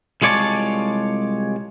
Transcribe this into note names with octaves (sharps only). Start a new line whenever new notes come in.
C2 G#3 F4 C#5 D5 A5